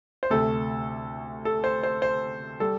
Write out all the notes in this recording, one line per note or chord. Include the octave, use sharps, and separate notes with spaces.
C5
D2 C3 A3 A4
A4
C5
C5
C5
G3 A4